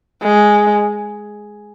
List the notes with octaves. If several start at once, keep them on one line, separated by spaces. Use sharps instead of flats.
G#3